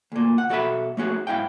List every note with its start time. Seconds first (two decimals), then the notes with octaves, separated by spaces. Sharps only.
0.12 D2 A#2
0.38 F#5
0.49 B2 F#4 A4 A#4 E5 B5
0.97 A3 C#4 F#4 G#4
1.27 G#2 E4 F5 G5